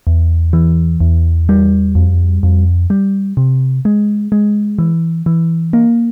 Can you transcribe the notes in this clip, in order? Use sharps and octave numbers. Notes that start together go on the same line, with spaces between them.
E2
E3
E2
G3
F2
F2
G3
C3
G#3
G#3
E3
E3
A#3